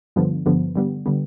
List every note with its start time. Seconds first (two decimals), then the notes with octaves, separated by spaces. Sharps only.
0.16 G2 D3 F3 B3
0.46 G2 D3 F3 B3
0.76 D3 G3 B3
1.06 D3 G3 B3